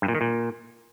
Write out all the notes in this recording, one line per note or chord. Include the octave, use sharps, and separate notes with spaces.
G2
A#2
D#3
A#2